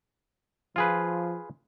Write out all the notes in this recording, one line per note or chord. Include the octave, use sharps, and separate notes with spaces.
F3 F4 G#4 B4